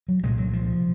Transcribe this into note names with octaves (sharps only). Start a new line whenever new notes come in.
F#3
C2 A#2 G#3
F#3
F3